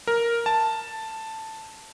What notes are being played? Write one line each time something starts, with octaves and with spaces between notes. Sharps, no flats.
A#4
A5